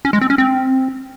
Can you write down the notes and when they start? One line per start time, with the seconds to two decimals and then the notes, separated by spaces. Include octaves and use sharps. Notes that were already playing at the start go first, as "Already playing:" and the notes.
0.05 C#4
0.13 G#3
0.21 C4
0.30 C#4
0.38 C4